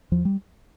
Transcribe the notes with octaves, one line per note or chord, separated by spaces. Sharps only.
E2 F3
G3